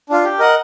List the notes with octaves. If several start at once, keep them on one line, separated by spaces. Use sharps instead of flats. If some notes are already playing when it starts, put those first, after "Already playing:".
D4 F4
G4
A#4 D#5 F#5